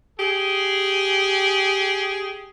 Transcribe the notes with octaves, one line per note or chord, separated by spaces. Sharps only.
G4 G#4